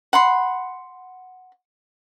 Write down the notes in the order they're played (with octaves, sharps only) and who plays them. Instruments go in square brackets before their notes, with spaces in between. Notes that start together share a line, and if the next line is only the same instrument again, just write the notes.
[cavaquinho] F#5 B5 C6